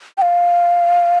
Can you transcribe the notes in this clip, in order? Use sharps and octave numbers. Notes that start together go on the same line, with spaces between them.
G5
F5